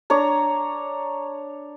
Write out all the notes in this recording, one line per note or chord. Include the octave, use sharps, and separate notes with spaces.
D4 C#5 A#5